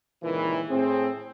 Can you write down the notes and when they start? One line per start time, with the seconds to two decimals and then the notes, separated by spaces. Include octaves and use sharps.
0.23 C#2 A#2 D#3 E3
0.69 A2 C4 G#4